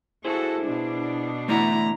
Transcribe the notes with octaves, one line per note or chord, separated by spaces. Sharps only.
E4 F#4 G#4 A4 C5
B2 D4
E2 A3 E4 D5 F#5 A#5